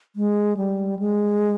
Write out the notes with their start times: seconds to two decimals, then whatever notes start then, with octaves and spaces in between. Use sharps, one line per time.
0.16 G#3
0.57 G3
0.99 G#3